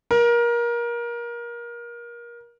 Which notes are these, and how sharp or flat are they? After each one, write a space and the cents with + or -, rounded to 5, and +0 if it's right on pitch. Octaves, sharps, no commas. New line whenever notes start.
A#4 +25